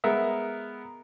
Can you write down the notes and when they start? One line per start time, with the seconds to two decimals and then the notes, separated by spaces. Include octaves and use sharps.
0.04 G#3 B3 A#4 E5